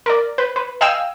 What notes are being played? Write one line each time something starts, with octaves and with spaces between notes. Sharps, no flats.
A#4 D5
B4
B4
D#5 F5 G5 G#5 D#6 E6